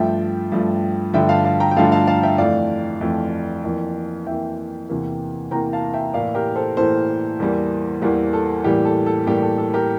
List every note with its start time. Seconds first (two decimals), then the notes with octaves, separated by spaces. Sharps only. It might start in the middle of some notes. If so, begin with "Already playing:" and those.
Already playing: G2 F3 A3 E5 G5
0.52 G2 F3 A3
1.14 G2 D3 F3 A3 E5 G5
1.29 F5 A5
1.44 F5 A5
1.60 G5 A#5
1.71 G5
1.76 G2 D3 F3 A3 F5 A5
1.92 F5 A5
2.07 F5 A5
2.23 E5 G5
2.38 F2 E3 A3 D5 F5
3.01 F2 E3 A3
3.64 F2 E3 A#3
4.26 F2 E3 A#3 E5 G5
4.89 E2 C3 E3 A#3
5.51 E2 C3 E3 A#3 G5 A#5
5.73 F5 A5
5.93 E5 G5
6.14 A2 E3 A#3 D5 F5
6.35 G4 A#4
6.56 A4 C5
6.77 A2 E3 A#3 A4 C5
7.40 E2 E3 G3 A#3
8.02 E2 E3 G3 A#3
8.33 A4
8.64 A2 E3 G3 A#3 G4
8.85 A4
9.06 A4
9.27 A2 E3 G3 A#3 G4
9.42 A4
9.58 A4
9.74 G4 A#4